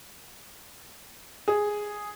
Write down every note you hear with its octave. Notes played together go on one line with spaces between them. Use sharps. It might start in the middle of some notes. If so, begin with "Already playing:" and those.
G#4